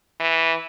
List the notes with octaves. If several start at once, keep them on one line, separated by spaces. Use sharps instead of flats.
E3